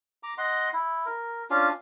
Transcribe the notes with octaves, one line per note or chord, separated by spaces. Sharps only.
A#5 D6
D#5 F#5 C6
E4
A#4
C#4 D4 F4 F5